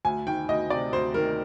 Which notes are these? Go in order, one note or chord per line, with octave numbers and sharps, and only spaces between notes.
D2 G#5
D#3 G5
D2 D#5
C3 D5
D2 C5
D#3 A#4